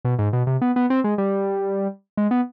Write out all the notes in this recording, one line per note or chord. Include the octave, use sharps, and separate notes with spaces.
B2
G#2
B2
C3
B3
B3
C4
G#3
G3
G#3
B3